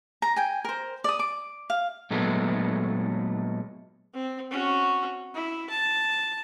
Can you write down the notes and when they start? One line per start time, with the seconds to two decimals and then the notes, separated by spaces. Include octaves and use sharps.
0.22 A#5
0.36 G5 G#5
0.65 A#4 C5
1.04 D5 D#6
1.19 D6
1.70 F5
2.11 A#2 F#3 G#3 A3 B3
4.14 C4
4.51 C#4 F#4
5.35 E4
5.70 A5